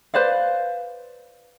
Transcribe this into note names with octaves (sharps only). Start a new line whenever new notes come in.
B4 C5 D5 F5